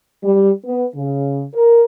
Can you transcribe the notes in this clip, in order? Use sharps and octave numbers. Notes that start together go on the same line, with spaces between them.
G3
B3
C#3
A#4